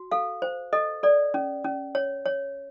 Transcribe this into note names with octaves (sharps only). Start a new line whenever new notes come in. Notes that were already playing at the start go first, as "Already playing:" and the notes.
Already playing: F#4
A4 F5
C5
A4 D#5
A4 D5
C#4
C#4
C#5
C#5